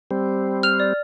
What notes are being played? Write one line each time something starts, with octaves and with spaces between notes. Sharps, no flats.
G3 C4
F6 F7
D5